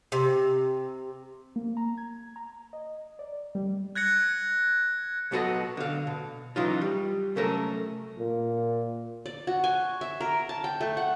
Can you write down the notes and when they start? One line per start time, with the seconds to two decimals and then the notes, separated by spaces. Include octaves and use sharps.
0.12 C3
1.56 A#3
1.77 A#5
1.97 G#6
2.36 A#5
2.73 D#5
3.19 D5
3.55 G3
3.95 F#6 G#6 A#6 C#7
5.31 B1 B2 F#3 F#4 A4 D#5
5.77 D3 F5
6.07 B2
6.56 C#3 E3 F#3 D#4 F4
6.81 G3
7.36 C3 F#3 A3 C#4 A4 A#4
8.18 A#2
9.26 D5
9.47 F#4
9.64 G#5
10.01 E5
10.21 A#4
10.49 A5
10.64 G5
10.81 A3
10.97 F#5